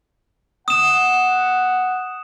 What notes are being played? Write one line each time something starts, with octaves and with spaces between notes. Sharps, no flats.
F#5 D#6 E7